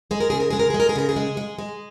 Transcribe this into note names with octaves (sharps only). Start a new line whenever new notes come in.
G#3 G#4
A#4
C#3 G#4
A#4
G#3 G#4
A#4
G#3 G#4
A#4
G#4
C#3 A#4
G#4
G#3
G#3
G#3